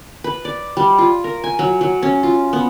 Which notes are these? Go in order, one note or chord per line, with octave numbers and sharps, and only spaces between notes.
B4
D5
G3
F4
A#4
G#5
F#3
F#3
C#4
F4
B3